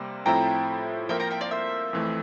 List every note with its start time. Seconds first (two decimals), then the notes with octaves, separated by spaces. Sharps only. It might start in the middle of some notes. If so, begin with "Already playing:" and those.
Already playing: C3 G3 A#3 C6
0.26 A2 F3 C4 E4 A4 G5 A#5
1.09 F3 A#3 F4 A#4 E5 G5
1.20 G5 A#5
1.31 E5 G5
1.41 D5 F5
1.51 C5 E5
1.93 F2 E3 A3